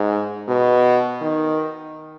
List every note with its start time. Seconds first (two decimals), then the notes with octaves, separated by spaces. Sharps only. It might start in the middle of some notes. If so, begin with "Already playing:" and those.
Already playing: G#2
0.48 B2
1.22 D#3